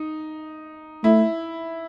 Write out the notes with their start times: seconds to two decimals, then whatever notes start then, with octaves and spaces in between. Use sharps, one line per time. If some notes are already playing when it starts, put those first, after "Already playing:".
Already playing: D#4
1.04 A3 E4